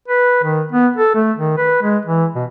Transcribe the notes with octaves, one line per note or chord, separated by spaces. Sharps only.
B4
D#3
B3
A4
A3
D#3
B4
G#3
E3
B2